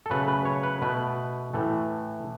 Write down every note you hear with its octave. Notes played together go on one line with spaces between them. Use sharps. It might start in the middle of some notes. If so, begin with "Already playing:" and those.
A4
C#3 F#3 A3 B4
B4
C#5
B4
B2 A3 B4
A2 E3 A3